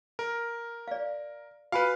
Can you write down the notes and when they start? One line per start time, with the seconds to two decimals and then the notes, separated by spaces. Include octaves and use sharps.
0.19 A#4
0.88 D5 F5
1.72 F#4 B4 F5 G#5 B5